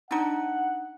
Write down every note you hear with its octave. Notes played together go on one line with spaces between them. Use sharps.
D4 D#4 F#5